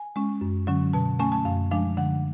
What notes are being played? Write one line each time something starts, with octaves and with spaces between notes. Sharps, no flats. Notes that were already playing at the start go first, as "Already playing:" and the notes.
Already playing: G#5
G#3 C#4
F#2
D3 F#3 C#4
B2 A5
A3 C#4 G#5
A5
F#2 F5
F3 G#3 D4 F5
D3 F#5